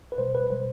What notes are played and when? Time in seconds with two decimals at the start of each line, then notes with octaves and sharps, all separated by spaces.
0.12 B4
0.18 B2 G3 C5
0.35 B4
0.50 B2 G3 C5